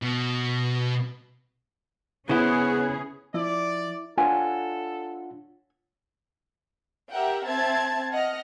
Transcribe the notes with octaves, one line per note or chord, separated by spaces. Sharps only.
B2
C#3 B3 C#4 E4 G#4 C5
F3 E4 D5
D4 F4 A4 C#5 F#5 G#5
G4 A#4 E5 F#5 G5
C4 E5 A5 G#6
D#5 F#5 F6 A#6